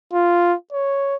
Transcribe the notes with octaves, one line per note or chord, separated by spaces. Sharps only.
F4
C#5